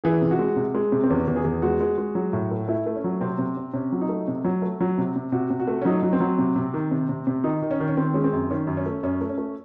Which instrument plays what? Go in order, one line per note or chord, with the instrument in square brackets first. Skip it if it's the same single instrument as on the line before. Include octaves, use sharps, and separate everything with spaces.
[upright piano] E3 G#4
C3
F#4
G#3
C3
G#3
C3
C4
E2 C#4
E2
G#4
E2
G#3 F#4
G#3
G#3
F#3
A2
A3
A3 E4
A3
C#4
F#3
C3 C4
C3
C3
C3 C#4
F#3
D#4
A3
C3
F#3
A3
F#3
C3
C3
C3 F#4
C3
F#4
A3
C#4
F#3 D#4
F#3
C4
F#3
C3
C3
D#3
C3
C3
C3
D#3 D#4
D#3
C#4
D#3
C#4
D#3 C4
G#3 C#4
C4
F#2
D#3 C#4
F#2
C#4
A3
F#2 C#4
A3
C#4
A3